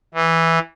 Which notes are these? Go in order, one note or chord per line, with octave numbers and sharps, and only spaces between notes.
E3